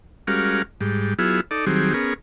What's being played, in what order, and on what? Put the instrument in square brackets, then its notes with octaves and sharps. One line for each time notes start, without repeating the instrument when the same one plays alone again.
[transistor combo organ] G3 G#3 C#4 F#4 A#4 F5
G#2 G3
F#3 B3 E4 F4 G#4
D#4 A4 D5
D#3 F#3 G3 C4 G#4
B3 C#4 G#4 A#4